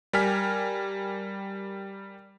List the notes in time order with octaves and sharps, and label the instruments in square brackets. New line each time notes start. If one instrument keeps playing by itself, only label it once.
[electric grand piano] G3 A#4 G5 G#5 F6 B6